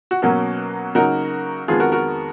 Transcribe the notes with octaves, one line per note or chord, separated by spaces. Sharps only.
F#4
B2 F#3 A#3 C#4 F#4
C#3 F#3 A#3 D#4 F#4 A#4
F2 D#3 G#3 B3 F4 G#4
F#4 A#4
F#4 A#4